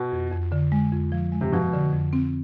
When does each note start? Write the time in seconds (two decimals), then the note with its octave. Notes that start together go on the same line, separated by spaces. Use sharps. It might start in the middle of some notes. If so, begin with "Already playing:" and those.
Already playing: B2
0.12 F2
0.32 F2
0.52 D3
0.72 G#3
0.92 F2
1.12 F3
1.32 G#3
1.41 C3
1.52 B2 F3
1.73 D3
1.93 F2
2.13 C4